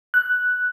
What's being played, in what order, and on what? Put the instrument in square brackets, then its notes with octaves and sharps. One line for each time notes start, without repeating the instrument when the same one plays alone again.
[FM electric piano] F#6